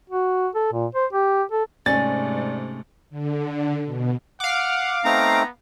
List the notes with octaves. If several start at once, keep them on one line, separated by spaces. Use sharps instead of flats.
F#4
A4
A#2
C5
G4
A4
G#2 C3 A3 C#4 D5 A6
D3
B2
F5 F#5 D6
A3 B3 C4 D#4 A#5